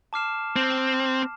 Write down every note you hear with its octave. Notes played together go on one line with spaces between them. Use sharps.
A5 D6 F6 C7 E7
C4